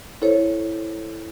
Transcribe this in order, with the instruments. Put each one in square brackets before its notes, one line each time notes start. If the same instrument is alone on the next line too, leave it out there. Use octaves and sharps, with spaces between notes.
[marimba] E4 A4 C5 C#5